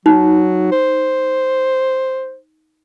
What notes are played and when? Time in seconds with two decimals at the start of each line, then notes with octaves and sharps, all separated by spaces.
0.06 F#3 D#4
0.72 C5